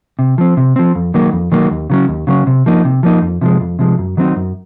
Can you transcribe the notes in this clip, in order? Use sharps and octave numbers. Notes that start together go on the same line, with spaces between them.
C3
F3 C4
C3
F3 C4
F2
D#3 F#3 A#3
F2
D#3 F#3 A#3
D#2
C#3 F#3 C#4
D#2
C#3 F#3 C#4
C3
F3 A#3 D#4
C3
F3 A#3 D#4
F2
C3 F3 G#3
F2
C3 F3 G#3
F#2
D#3 F#3 C4 D#4
F#2